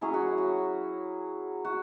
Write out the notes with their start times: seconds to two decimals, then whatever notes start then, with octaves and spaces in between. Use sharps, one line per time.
0.01 F#3 C#4 E4 G#4
0.14 F#4
0.38 F#4
1.65 F#4